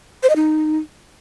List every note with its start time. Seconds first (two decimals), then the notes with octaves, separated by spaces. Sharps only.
0.23 C5
0.29 D#5
0.36 D#4